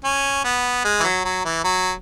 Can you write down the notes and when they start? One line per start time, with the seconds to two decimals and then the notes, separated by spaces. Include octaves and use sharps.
0.04 C#4
0.44 B3
0.85 G#3
1.00 E3
1.04 F#3
1.25 F#3
1.45 E3
1.64 F#3